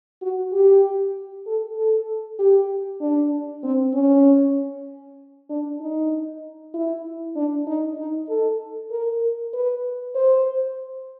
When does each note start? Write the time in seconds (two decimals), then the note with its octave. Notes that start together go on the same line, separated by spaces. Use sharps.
0.22 F#4
0.53 G4
1.47 A4
1.77 A4
2.39 G4
3.01 D4
3.64 C4
3.94 C#4
5.50 D4
5.81 D#4
6.74 E4
7.36 D4
7.67 D#4
7.98 D#4
8.29 A4
8.91 A#4
9.54 B4
10.15 C5